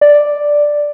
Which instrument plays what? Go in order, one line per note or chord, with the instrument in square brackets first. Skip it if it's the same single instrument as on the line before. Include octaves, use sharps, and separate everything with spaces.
[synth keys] D5